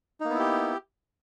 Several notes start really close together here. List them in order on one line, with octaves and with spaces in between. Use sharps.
D#4 A#3 B3 E4 G4